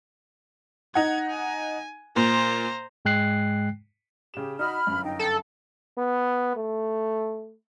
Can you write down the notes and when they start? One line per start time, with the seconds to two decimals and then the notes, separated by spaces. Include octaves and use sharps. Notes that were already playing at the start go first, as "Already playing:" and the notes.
0.95 D#4 F#5 G#6
1.31 G#5
2.16 A#2 C5 A#5
3.05 G#2 G#3 G5 F#6 C7
4.34 C#3 G4 E7
4.59 D#4 F#4 D#5 B5 F6
4.87 G1 F#2
5.04 D#4 G5
5.19 A4
5.98 B3
6.56 A3